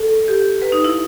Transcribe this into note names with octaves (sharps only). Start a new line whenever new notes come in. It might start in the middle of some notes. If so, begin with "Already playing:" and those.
Already playing: A4
G4
B4
D#4
E4